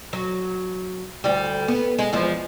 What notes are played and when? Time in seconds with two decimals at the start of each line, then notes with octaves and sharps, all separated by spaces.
0.13 F#3
1.24 D2 G3
1.68 B3
1.98 G#3
2.13 E2 F3 G#3